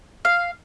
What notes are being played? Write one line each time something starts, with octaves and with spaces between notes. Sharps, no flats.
F5